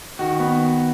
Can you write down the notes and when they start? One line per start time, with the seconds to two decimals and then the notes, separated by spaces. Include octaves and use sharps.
0.19 D#3 F#4
0.40 B3